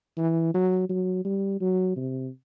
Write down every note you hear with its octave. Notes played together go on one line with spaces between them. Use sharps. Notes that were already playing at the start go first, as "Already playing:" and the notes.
E3
F#3
F#3
G3
F#3
C3